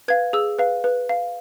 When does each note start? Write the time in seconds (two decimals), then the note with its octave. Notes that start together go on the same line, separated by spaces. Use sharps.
0.08 B4 F5 G#6
0.33 G#4 E6
0.59 B4 F5
0.84 B4
1.09 F5